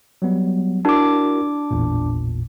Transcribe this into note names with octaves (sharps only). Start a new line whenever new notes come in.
F#3 G3 B3
D4 E4 F#4 A#4 D6
A1 E2 A#2